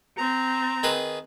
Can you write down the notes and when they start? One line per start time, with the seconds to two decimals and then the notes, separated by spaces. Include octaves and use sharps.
0.18 C4 A#5
0.83 D#3 G#4 B4